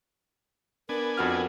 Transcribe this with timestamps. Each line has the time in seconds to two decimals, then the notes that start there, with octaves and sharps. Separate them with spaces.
0.89 B3 D4 A#4 G#5
1.17 F2 F#4 F6